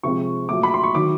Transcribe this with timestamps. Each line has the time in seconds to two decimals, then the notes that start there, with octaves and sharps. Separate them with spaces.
0.03 C3 F3 G#3 C4 C#6
0.49 A#2 F#3 A3 D6
0.63 B5
0.74 C6
0.83 C#6
0.95 D#3 F#3 D6